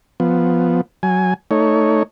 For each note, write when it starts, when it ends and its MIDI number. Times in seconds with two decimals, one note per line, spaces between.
0.20 0.81 53
0.20 0.81 59
1.03 1.34 54
1.03 1.34 80
1.51 2.03 57
1.51 2.03 63
1.51 2.03 73